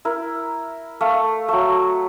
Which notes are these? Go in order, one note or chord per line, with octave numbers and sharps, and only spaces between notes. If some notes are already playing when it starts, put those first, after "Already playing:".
E4 A#4
A3 F5
F#3 A3